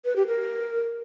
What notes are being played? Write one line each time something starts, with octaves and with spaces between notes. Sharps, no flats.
B4
G4
A#4